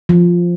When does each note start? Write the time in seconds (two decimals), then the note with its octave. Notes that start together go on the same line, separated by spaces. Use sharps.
0.09 F3